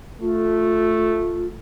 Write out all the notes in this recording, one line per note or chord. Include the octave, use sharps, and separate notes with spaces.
A3 F4